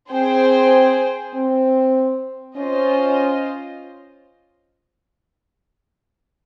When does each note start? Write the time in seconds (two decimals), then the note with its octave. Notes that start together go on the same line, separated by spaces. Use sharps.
0.11 C4 G#4 C5 G5
1.35 C4
2.57 C#4 F4 C5 D#5